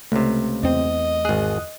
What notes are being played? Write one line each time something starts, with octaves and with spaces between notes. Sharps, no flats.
C#2 C3 A3
E2 C4 D#5
G#1 G#4 D#6 F#6